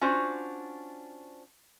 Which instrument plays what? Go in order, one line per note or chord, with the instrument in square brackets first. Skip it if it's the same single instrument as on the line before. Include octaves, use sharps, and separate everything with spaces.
[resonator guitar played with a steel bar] C#4 D4 F4 F#4 C5